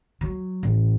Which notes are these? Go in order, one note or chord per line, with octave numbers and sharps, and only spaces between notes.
F#3
A1